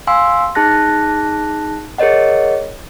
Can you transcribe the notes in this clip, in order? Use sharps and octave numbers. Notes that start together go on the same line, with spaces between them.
F5 G#5 C6 E6
D#4 G#4 A5 F#6 A#6
G#4 A#4 C#5 D#5 F#5